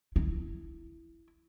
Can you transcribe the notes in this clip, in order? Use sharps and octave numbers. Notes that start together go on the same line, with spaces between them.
E4